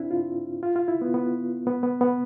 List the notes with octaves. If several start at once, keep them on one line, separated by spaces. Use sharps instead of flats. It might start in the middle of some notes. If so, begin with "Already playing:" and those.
Already playing: C4 D4 E4
F4
F4
F4
E4
B3
B3
B3
B3
B3